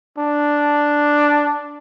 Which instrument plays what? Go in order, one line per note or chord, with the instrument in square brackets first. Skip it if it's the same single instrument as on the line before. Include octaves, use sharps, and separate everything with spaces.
[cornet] D4